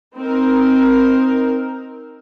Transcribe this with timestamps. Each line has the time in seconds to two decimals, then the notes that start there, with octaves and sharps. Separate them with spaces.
0.15 C4 D#4 A#4